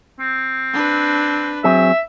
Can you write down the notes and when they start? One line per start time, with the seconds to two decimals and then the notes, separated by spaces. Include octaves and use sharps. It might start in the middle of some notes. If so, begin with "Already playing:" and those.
0.20 C4
0.73 D4 B4
1.64 F#3 C4 G#4 E5